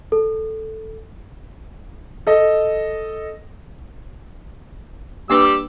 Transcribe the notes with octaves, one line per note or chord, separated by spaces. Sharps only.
A4
A4 D#5
G3 A#3 D4 G4 B4 E6